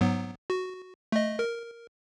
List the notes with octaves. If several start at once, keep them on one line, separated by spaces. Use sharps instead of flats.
G#2 F#3 B3
F#4
A3 D#5
A#4